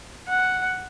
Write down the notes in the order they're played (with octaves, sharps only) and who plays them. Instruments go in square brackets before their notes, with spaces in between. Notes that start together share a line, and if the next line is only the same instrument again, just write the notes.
[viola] F#5